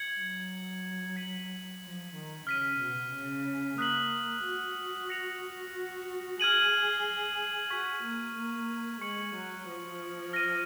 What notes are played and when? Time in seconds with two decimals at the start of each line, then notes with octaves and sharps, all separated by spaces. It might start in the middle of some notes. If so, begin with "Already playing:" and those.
Already playing: G#6 C#7 F#7
0.18 F#3
1.16 G#6 B6 D#7 F#7
1.81 F3
2.14 D#3
2.47 C#3 F6 B6 D#7
2.79 B2
3.12 C#3
3.78 A#3 D#6 F#6 B6 F#7
4.43 F#4
5.09 D#6 A#6 C#7 F7
5.73 F#4
6.39 G#4 F6 G#6 D#7 F#7
7.70 F#4 C#6 G#6 B6
8.03 A#3
8.36 A#3
9.01 G#3 C#6 G#6 C#7 F#7
9.35 F#3
9.67 F3
10.33 F6 A#6 D#7